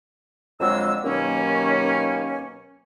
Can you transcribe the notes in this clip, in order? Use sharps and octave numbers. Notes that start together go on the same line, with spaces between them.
F2 D3 F#3 G#3 E6
D#2 B2 D#3 F#3 A#3 C#4